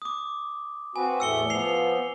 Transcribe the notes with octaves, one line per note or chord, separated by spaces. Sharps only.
D6 D#6
C4 F#4 B4 G#5
E2 A2 A3 E6 C#7 G7
F3 B3 C7 F7